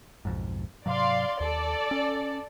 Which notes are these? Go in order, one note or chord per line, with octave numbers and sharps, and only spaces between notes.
B1 F2 G#2
G#2 C3 F#3 D5 F5 C6
D#2 A4 D5
C#4